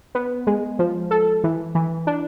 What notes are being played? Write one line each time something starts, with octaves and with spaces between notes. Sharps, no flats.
B3
G#3
F3
A4
E3
E3
D4